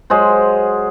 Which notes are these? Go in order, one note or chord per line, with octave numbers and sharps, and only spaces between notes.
F#3 G#3 C5